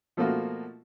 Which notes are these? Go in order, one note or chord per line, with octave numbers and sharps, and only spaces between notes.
B2 F3 A3 A#3 F4 F#4